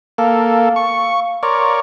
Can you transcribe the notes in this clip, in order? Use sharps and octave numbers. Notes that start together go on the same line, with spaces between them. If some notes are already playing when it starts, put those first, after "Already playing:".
A#3 A4 F5
C#6
A#4 C#5 D5 C6